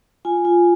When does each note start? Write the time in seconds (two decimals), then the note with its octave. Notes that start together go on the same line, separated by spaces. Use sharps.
0.25 F4 G#5
0.45 F4